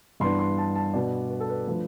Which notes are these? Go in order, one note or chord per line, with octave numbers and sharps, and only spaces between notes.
G2 E3 B3 D4 C6
C6
A5
A5
B2 B3 D4 D5
B4
A4
B4
F3 A3 D4 B4